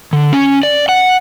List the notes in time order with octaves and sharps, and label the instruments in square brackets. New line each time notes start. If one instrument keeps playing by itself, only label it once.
[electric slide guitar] D3
C#4
D5
F#5